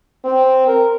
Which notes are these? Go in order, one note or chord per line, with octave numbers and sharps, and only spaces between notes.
C4
A#4